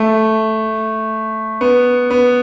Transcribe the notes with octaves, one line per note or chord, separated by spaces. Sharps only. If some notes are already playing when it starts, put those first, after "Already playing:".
Already playing: A3
B3
B3